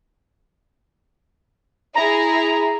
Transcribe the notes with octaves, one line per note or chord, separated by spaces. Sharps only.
E4 G#4 A#5